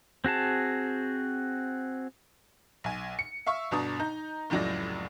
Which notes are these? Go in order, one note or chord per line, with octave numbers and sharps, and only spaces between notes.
C4 F#4 G#4 A5
B1 G#5
C#7
E5 F5 C#6 E6
G1 B2 D4 A#5 D#6
D#4 A#5 G6
F1 C#2 A2 F#3 D5 A#6